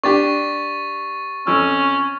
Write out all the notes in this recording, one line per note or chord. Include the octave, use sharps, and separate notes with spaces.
D4 G4 C#6 A6
F2 C#4 E6